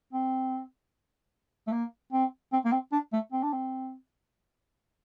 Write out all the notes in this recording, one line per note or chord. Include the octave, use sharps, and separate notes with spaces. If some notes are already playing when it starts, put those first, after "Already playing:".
C4
A3
A#3
C4
C4
A#3
C4
D4
A3
C4
D4
C4